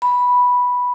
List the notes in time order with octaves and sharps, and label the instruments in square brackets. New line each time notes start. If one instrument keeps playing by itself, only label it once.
[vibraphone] B5